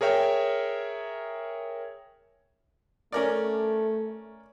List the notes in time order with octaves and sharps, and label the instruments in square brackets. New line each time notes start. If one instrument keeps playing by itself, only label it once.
[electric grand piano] G#4 A#4 C#5 E5 G5
[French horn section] A3 [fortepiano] C#4 A#4 D5